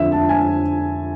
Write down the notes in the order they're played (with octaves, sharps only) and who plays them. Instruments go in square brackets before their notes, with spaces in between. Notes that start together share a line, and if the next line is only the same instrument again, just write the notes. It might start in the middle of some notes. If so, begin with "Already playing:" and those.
Already playing: [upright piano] F2 D3 F3 E5
A5
G#5